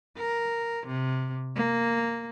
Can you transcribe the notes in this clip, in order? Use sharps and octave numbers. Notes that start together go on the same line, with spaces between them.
A#4
C3
A#3